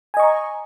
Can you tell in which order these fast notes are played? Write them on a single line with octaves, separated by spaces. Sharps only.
G#5 D#5 C#6 A#5